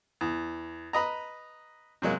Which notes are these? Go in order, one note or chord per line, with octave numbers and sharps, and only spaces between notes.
E2
B4 D#5 A#5
C3 F#3 G#3 A#3